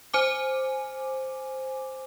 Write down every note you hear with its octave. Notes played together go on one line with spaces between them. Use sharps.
C5 G#5 D6